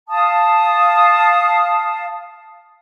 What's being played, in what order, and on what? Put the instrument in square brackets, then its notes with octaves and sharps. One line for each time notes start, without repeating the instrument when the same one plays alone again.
[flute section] F5 A5 D#6